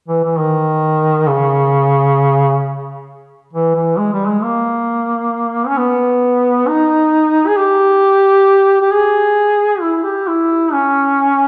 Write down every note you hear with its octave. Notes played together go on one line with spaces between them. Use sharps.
E3
E3
D#3
C#3
E3
E3
G#3
G3
G#3
A#3
C#4
B3
D#4
G#4
G4
G4
G#4
E4
G4
E4
C#4